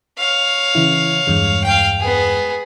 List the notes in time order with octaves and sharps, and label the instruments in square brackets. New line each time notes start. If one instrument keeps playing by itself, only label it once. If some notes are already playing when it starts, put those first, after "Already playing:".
[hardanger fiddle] C#5 F5
[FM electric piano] C#3 E3 E4
E2 G2 G#3
[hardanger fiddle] F5 G5
B3 G#4